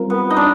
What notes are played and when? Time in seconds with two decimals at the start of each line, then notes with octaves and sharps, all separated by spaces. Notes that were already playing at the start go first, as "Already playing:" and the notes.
Already playing: G3 C4 F4 A#4
0.10 B3
0.30 D#4
0.37 D4